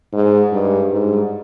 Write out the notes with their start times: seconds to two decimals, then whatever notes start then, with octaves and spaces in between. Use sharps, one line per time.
0.13 G#2
0.52 G2
0.92 G#2